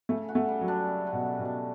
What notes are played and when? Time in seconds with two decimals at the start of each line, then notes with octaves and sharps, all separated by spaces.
0.09 C#3 A3
0.28 F#4
0.35 A3
0.48 G3
0.61 F#3
0.68 D4
0.87 C#3
1.07 F#4
1.13 B2
1.26 G3
1.39 B2
1.45 D4